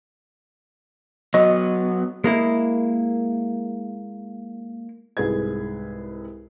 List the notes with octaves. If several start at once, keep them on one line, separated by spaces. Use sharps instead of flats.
F#3 B3 D#5
G#3 A#3 E4
C2 G#2 G#4 B4 G#6